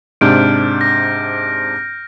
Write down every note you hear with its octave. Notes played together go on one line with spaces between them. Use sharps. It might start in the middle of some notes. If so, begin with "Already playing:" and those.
G#2 C3 D4 F6 G6 D7
A#6